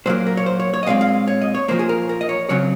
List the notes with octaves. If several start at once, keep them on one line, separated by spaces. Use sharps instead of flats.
A#2 F#3 A#3 C5
A#4
C#5
C5
C#5
C#5
D#5
A#2 G#3 C4 F5
F5
C#5
D#5
C#5
A#2 F3 A#3 C5
G#4
A#4
A#4
D#5
C#5
C#3 F#3 C4 C#5